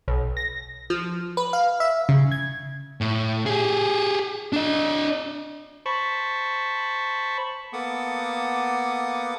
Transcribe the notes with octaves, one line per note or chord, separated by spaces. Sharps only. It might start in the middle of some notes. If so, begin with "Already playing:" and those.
B1
A#6
F3
B4
F5
E5
C#3
G#6
A2
G4 G#4
D4 D#5
C5 A5 B5 C#6
A#3 B3 A4 F#5 D6 D#6